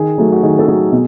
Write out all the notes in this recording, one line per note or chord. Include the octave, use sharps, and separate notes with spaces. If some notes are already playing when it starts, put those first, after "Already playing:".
Already playing: D#3 G#4
F#3 A3
F#4
D#3 G#4
A4
F#3 A3 G#4
B2